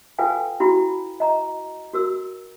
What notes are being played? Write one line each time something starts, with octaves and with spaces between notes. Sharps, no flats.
F4 A4 B4 F5 G5 G#5
E4 F#4 B5
D#5 A#5
F#4 A#4 E6